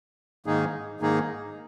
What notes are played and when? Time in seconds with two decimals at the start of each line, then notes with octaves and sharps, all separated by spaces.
0.46 G#2 D#3 A#3 D#4 G#4
1.00 G#2 D#3 A#3 D#4 G#4